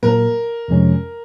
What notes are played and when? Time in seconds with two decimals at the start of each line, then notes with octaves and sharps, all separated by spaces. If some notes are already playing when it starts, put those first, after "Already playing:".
0.03 A#2 F#3 A#3 A#4
0.68 F2 C3 F3 G#3 C#4